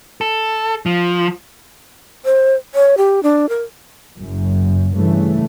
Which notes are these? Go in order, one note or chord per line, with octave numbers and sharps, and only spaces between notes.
A4
F3
C5
C#5
G4
D4
A#4
F#1 F#2
G2 C#3 E3 A3